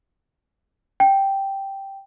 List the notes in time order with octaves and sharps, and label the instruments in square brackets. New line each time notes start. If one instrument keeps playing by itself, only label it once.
[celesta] G5